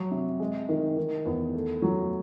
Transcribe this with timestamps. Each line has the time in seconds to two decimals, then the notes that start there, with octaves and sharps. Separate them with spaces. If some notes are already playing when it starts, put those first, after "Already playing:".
Already playing: F#3
0.11 C3
0.40 G#3
0.69 D#3
0.97 D#3
1.25 E2
1.55 A3
1.82 F#3